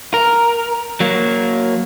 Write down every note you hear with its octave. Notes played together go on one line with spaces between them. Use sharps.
A#4
F#3 A#3